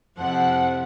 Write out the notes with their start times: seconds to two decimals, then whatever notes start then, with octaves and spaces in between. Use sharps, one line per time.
0.18 F2 C3 F3 E4 F#5